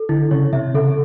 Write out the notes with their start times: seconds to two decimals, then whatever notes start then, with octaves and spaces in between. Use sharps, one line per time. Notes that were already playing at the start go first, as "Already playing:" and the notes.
Already playing: A4
0.09 D3 E4
0.31 C#3 C#5
0.53 C3 E5
0.74 C#3 A4